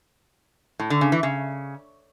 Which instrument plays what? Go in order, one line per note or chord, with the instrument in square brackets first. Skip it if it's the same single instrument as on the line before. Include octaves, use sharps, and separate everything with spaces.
[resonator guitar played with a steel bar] A2
D3
C#3
E3
C#3